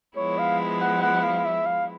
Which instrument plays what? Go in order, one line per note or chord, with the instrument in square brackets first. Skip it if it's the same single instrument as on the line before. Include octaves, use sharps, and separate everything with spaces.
[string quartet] F3 G#3 B3 E4 [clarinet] C#5
[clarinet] F5
F#5
F#5
F5
E5
F5